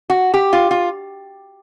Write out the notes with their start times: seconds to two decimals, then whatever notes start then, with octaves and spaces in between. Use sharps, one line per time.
0.10 F#4
0.34 G4
0.53 F4
0.71 F4